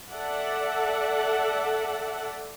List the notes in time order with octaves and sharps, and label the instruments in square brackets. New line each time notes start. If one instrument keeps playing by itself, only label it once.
[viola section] A4 D5 E5 F#5